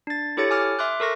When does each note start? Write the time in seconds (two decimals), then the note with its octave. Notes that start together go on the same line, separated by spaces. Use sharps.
0.07 D4 A6
0.37 E4 G4 A4 C#5 A6 C#7
0.51 G#5 D6 F6
0.79 E5 C6 D6 F#6
1.00 A4 A#4 C#6 A#6